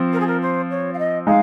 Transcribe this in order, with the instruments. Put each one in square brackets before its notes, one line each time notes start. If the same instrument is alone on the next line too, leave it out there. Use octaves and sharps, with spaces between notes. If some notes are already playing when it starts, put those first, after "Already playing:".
Already playing: [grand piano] F3 C4 F4
[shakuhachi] A#4
G#4
A#4
C5
C#5
F5
D#5
[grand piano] G#3 D#4 [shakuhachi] F5